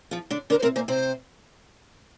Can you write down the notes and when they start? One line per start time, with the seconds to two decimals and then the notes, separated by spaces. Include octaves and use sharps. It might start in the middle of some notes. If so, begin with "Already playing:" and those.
0.11 F3 F4
0.30 D3 D4
0.50 D3 D4 A#4
0.59 C5
0.62 C3 C4 A#4
0.75 A#2 A#3 C5
0.88 C3 C4 C5